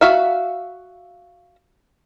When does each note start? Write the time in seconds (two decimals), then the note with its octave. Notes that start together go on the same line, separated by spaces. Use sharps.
0.01 F#4 E5 F5